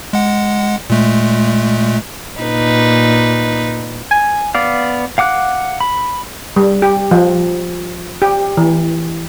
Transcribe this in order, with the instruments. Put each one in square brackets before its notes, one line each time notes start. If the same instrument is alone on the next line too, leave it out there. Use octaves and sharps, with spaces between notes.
[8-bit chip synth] G#3 F#5
A#2 G#3 A3
[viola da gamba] A#2 D#4 B4
[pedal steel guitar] G#5
B3 D5 F5
F5 F#5 D6 F#6
B5
[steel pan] G3
G4
F3
G4
E3